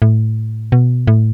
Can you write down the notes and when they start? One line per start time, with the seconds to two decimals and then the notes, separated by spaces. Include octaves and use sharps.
0.02 A2
0.72 B2
1.07 A2